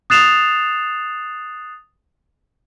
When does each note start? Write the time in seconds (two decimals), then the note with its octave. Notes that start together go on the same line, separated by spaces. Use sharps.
0.10 D#6 F#6 A6 C7 E7 F7